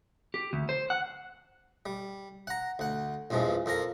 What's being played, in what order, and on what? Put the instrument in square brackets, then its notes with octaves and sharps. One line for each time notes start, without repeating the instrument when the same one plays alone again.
[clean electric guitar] G4
D2
C5
F#5
[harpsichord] G3
F#5 A#5
D2 F#5
A#1 E2 G2 F3 G#3
F2 F3 A#4 A#5